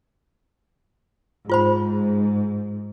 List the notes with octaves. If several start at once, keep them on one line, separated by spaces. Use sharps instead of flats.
G#2 F4 C5 B5